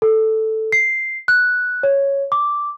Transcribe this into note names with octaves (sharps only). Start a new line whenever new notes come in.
A4
C7
F#6
C#5
D6